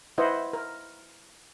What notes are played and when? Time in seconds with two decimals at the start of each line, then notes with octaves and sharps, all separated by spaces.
0.18 E4 B4 C5 D#5 F#5
0.53 A#4